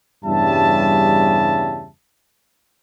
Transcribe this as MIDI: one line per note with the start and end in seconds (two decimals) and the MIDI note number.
0.25 1.88 40
0.25 1.88 43
0.25 1.88 49
0.25 1.88 55
0.25 1.88 76
0.25 1.88 81